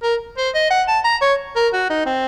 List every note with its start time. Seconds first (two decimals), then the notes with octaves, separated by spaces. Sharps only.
0.03 A#4
0.38 C5
0.54 D#5
0.70 F#5
0.88 A5
1.04 A#5
1.21 C#5
1.56 A#4
1.73 F#4
1.90 D#4
2.06 C4